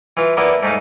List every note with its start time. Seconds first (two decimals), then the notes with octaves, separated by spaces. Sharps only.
0.17 E3 F4
0.37 A#3 B3 D4 E4
0.63 G#2 A3 D#4 F5